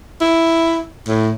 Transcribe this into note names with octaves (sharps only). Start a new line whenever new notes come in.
E4
A2